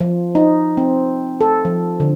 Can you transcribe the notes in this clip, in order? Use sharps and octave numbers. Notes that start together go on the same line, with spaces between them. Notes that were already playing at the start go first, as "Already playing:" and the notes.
F3
D#4
C4
A4
F3
D3